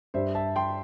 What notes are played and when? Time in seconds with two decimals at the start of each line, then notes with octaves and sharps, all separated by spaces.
0.14 G2 G3 C5 E5
0.35 E5 A5
0.56 G5 C6